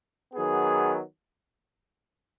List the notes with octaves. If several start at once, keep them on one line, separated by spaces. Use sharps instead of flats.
D#3 F#3 B3 G#4